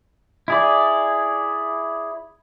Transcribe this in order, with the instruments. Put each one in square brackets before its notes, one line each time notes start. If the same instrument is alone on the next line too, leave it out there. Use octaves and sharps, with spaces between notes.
[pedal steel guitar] E4 G#4 D5